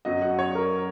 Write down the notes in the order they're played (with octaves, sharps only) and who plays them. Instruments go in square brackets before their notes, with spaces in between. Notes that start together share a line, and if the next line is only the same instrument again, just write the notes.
[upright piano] F#2 F#3 D#5
F#5
C#5
A#4